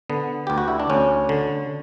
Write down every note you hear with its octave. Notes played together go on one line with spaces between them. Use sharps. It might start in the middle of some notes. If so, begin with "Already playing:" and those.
D3 B3
D2 G4
F#4
E4
D4
D2 C#4
D3